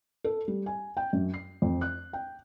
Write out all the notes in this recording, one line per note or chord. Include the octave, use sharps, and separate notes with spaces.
A4
G3
G#5
G5
F#2
C7
F2
F#6
G5